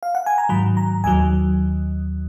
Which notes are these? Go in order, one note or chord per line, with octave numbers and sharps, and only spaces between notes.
F5
F#5
G#5
A#5
G#2 D#3 F#3 B5
A#5
D#2 D#3 F#3 G#5